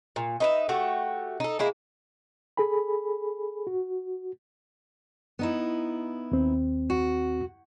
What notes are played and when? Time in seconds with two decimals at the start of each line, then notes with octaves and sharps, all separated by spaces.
0.16 A#2
0.40 D#4 B4 E5
0.69 A3 F#4 G4
1.40 D#4 A4
1.59 G#3 A#3 E4
2.57 G#4 A4 G#5 B5
3.67 F#4
5.39 B3 D#4 E4
6.32 D#2 C4
6.90 F#4